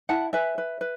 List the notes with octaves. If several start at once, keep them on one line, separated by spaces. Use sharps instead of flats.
E4 F#5 A5
B4 E5 G#5
B4
B4